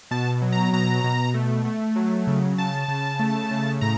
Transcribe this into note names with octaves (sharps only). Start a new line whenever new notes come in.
B2 A5
F#3
A#5
B2 A#5
B2
A3
A3
F#3
C#3
C#3 A5
C#3
A3
C#3
A2 A#5